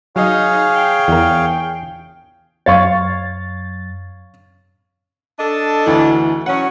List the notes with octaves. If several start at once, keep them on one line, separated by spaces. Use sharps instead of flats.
F#3 D#4 G#4 C#5 D#5 F5
G5
E2 A#4
F#2 C#5 F5 C#6 A6
D4 A4 D#5
D2 E3
F#3 C#4 F#5